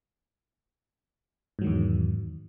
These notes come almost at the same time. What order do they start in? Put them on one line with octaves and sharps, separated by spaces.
G#2 F#3 D#3 E2